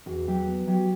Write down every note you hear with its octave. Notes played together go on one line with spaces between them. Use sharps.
E2 F#4
F#3 G4
B3
F#3 G4